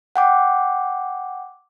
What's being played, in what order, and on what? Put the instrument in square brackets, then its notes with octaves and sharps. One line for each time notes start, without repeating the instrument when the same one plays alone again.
[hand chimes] F#5 G5 D6